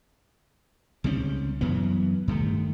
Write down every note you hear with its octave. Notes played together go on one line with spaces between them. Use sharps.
C#2 G3 C4 C#4
F#2 E3 B3
G2 D#3 A3